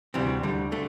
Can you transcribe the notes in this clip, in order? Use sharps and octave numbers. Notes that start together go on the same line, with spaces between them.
D2 C3 E3 G3 C4
D2 D3 G3
D3 A3